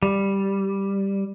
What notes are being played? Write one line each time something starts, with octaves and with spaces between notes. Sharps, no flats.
G3